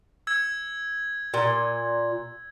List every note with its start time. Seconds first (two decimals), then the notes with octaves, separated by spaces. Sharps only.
0.27 E6 G#6
1.34 A#2